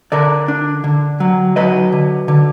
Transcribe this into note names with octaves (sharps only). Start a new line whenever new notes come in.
D3 A#4 D5
D4
D3
F#3
F#3 B4 D#5
D3
D3